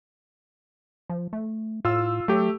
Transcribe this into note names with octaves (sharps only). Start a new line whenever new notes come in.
F3
A3
A2 F4 E6
F#3 A3 G4